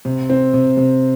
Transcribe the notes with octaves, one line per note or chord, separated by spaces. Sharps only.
C3
C4
C3
C3